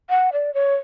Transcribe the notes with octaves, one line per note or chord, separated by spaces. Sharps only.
F#5
D5
C#5